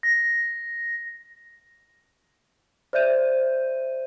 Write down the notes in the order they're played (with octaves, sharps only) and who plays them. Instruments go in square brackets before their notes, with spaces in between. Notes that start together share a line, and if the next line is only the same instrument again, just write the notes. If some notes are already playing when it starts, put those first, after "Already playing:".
[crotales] A#6
[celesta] C5 D5 E5 G6 D#7